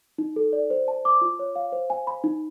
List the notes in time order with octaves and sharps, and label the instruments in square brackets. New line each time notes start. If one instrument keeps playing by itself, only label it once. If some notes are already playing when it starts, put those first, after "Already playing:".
[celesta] D#4
A4
D5
C5
A5
D6
F4
C#5
F5
C5
G#5
B5
D#4